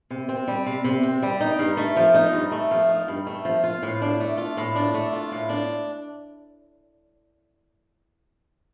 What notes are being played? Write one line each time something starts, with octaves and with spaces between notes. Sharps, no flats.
C3
C4
G3
C3
C3
C4
G3
D#4
G2
A3
F3
D#4
G2
A3
F3
D#4
G2
A3
F3
F4
A2
D4
A3
F4
A2
D4
A3
F4
A2
D4